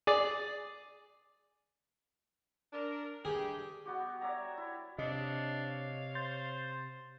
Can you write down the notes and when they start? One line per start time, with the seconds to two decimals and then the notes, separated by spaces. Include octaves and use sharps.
0.07 G#4 D5
2.73 D4 A#4
3.25 G2 A3 G4 G#4
3.86 B3 F#4 G4
4.21 C#5 D5 E5 A#5
4.58 E4
4.98 C3 D4 C#5 D#5 F5
6.15 C5 C6 G6 A6